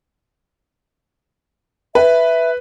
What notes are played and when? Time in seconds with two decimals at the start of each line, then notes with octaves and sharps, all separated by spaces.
1.95 B4 E5